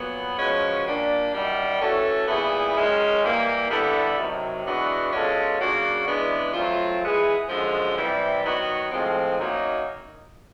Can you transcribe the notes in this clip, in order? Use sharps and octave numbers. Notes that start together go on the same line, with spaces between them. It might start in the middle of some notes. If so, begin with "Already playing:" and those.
Already playing: A#2 F#3 B3
F3 G#3 C#4 F#4 B4
A#2 G3 A#3 D4
F#2 D#3 G3
E3 A3 C#4 F#4 A4
A#2 G3 B3 E4 G#4
F#2 D#3 G#3 C#4
E3 G3 A#3
D3 G3 B3 E4 A4
C3 D#3 F#3
E3 G#3 B3 D4 F#4
B2 G#3 C#4 F4 A4
C#3 F#3 A#3 D4 F#4
C#3 E3 G#3 B3 D4
F#3 A3 C4 F4
G#3 B3 E4 G#4
F#2 D3 F3 G#3
C3 E3 G3
D#3 F#3 B3 D#4 F#4
A2 F3 G#3 C4
F#2 D#3 F#3 A#3 D#4